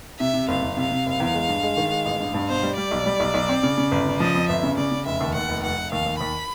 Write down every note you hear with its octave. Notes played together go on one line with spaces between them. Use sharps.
C3 E5
C3
F#1 F5
F#1
C3 F5
C3
F#1
E2
G#3
G2
G#3
D#3
G#3
A1
G2
G2
B2 C5
G3
G3 D5
B1
G3
B1
B1
C4
C#3
C#3
G1
C#3
F3 D#5
F2
G1 E5
C#3
C#3 D5
C#3
F1 E5
D#2
D#2 F#5
F1
F1 F#5
F1
D#2 F5
D#2
D#2 B5